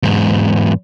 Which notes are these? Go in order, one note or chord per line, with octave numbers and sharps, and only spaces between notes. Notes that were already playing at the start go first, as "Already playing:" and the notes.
E2 G#2